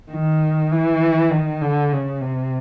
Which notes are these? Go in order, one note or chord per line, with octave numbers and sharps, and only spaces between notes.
D#3
E3
D#3
D3
C#3
C3